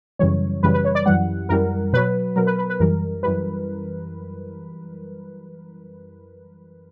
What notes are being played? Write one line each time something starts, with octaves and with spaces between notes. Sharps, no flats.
F#2 C#3 E3 G3 C#5
F#2 C#3 E3 G3 B4
B4
C#5
D5
F#2 E3 G3 F#5
F#2 E3 G3 A#4
B2 F#3 B4
B2 F#3 A#4
B4
B4
B4
F#2 E3 G3 A#4
F#2 E3 G3 B4